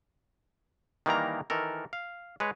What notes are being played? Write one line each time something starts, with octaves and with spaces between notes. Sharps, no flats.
D#3 E3 G3 A#3 A#4 A#5
D#3 E3 A4 A#4
F5
G#3 B4 C#5